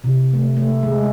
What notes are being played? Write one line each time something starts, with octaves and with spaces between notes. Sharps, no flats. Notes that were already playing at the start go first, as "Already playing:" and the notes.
C3
A3
A3
G#3